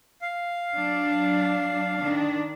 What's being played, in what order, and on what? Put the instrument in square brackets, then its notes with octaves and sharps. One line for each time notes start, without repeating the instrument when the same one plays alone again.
[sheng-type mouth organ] F5
[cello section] F#3 D4
D#3 D4